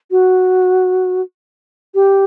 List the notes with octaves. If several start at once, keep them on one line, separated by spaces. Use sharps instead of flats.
F#4
G4